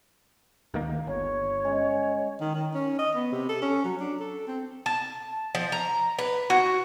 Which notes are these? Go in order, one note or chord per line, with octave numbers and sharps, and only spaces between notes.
D2 D#3 A#3
G1 C#5
G#3 C#4
D#3
D#3
C#4
D#5
B3
C3
A4
C#4
F#3
D4
A4
C4
A5
F3
A#5
B4
F#4